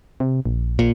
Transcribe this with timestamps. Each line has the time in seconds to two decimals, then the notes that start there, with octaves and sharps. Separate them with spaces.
0.20 C3
0.46 A#1
0.79 A#2